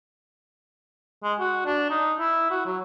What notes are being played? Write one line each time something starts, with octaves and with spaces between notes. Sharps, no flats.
G#3
F#4
D4
D#4
E4
F#4
F#3